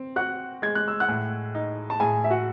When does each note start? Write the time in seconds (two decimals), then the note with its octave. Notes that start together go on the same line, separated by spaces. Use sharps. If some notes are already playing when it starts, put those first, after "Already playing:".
Already playing: C4
0.16 F#4 F#5 F#6
0.62 G#3 G#6
0.75 F#6
0.88 E6
1.00 F#5 F#6
1.08 A2
1.55 D#4
1.90 A5
2.00 A2 G#4 G#5
2.24 E5
2.30 F#4 F#5